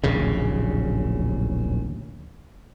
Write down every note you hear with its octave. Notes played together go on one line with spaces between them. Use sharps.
D1 A#1 D#2 C#3